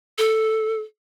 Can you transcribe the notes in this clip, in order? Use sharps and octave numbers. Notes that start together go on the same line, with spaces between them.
A4